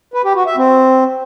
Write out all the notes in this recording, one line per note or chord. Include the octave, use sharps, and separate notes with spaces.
B4
G4
F#4
E5
C4